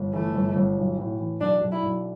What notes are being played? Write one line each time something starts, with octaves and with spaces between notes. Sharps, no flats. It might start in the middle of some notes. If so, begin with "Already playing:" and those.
Already playing: G1
E3 A3
G1
G1
B1
A2
E3
B1 D4
B1
E4
B1